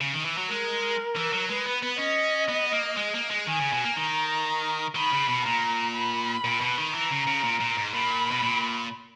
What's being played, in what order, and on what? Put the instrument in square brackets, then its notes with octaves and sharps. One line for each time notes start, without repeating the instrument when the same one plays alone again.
[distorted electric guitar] C#3
D#3
E3
F#3
[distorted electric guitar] G#3 [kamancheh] A#4
[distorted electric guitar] E3
F#3
[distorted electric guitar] G#3 [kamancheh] B4
[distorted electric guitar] B3
B3
[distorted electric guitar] C#4 [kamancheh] D#5
[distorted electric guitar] B3
A#3
G#3
A#3
G#3
[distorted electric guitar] D#3 [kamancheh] G#5
[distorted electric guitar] C#3
B2
A#3
[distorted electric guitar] D#3 [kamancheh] A#5
[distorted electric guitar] D#3 [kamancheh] B5
[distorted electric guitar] C#3
B2
[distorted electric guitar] A#2 [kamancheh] A#5
[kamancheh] B5
[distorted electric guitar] A#2
B2
D#3
[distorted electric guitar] E3 [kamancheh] A#5
[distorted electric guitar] C#3
C#3
A#2
A#2
G#2
[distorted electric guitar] A#2 [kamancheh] B5
[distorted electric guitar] B2
A#2